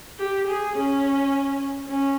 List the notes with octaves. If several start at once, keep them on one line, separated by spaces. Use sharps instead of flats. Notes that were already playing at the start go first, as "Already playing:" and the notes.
G4
G#4
C#4
C#4